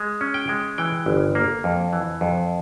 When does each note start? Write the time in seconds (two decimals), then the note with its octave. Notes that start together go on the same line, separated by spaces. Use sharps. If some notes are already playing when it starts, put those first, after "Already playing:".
Already playing: G#3
0.21 C#4
0.34 G5
0.49 G#3
0.78 E3 G5
1.06 G1
1.35 A#3
1.64 F2
1.93 E3
2.21 F2